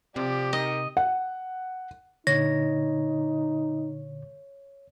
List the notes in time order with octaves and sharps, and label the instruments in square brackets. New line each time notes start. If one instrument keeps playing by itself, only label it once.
[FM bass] C3 [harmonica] F3 D5 [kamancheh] G4
[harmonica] D#4 A#4 [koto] D#5
[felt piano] F#5
[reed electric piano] A#2 D3 [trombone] D#4 [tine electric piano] C#5 [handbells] A#6